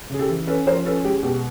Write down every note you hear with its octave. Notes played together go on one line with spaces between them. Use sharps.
C#3 G#4
G4 A4
E3
C#4 A4 B4
F3 A#4 C5
C#4 A4 B4
G#3 G4
B2 G4